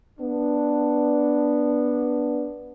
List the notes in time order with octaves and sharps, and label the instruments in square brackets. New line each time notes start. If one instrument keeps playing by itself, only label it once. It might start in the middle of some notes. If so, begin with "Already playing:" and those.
[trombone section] B3 D4